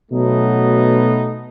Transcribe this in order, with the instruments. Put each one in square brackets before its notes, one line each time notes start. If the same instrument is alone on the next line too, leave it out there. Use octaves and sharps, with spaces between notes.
[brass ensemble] B2 F#3 A3 B3 D#4